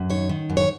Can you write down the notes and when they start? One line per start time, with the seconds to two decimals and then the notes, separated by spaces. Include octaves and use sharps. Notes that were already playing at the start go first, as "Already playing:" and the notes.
Already playing: F#2
0.10 D#3 C#5
0.29 D#3
0.50 F#2
0.57 C#5